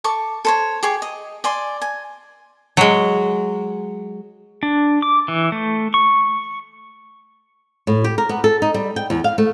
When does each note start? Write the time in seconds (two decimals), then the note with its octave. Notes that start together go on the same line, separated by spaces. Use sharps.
0.04 A4 C#6 D6
0.45 A4 C5 C#5
0.83 G4 G#4 C#6
1.02 D#5
1.44 D5 G#5 C6
1.82 G#5
2.77 F#3 G#3
4.63 D4
5.02 D6
5.28 E3
5.52 A3
5.94 C#6
7.87 A2
8.04 G4
8.18 A#4
8.29 B3
8.44 A4
8.62 D#4
8.74 G3
8.96 G5
9.10 E2
9.24 F5
9.38 A3